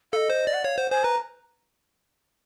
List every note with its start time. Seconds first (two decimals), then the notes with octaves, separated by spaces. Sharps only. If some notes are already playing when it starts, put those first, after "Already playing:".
0.12 A4 D#5 F5
0.30 C5
0.47 D5
0.53 F#5
0.64 C#5 F5
0.78 C5 F#5
0.91 C5 G#5
1.04 B4 A#5